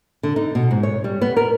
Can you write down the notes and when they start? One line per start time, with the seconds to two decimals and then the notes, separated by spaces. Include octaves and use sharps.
0.23 D3
0.36 D#4
0.55 B2
0.71 G#2
0.83 C#5
1.04 G3
1.22 B3
1.37 A#4